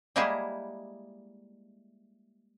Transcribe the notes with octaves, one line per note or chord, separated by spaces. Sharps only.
G3 G#3 A#3 E4 G4 G#4